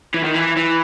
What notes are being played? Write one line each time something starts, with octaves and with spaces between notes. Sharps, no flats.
E3
D#3
E3
E3